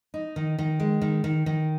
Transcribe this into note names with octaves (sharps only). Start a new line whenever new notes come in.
D#4
D#3
D#3
G#3
D#3
D#3
D#3